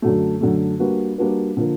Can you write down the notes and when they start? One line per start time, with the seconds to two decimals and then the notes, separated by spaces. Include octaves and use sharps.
0.02 F#2 D3 F#3 A3
0.41 F#2 D3 F#3 A3
0.79 G3 A#3 D4 F#4 B4
1.18 G3 A#3 D4 F#4 B4
1.57 D3 F3 A#3